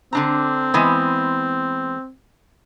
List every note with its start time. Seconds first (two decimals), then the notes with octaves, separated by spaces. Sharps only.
0.13 D3 C4 D4 A#5
0.74 E3 G#3 B3